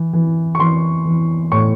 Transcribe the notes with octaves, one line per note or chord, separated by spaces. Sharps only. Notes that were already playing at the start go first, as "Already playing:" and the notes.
Already playing: E3
E3
C#6
E3 C6
E3
A2 C#6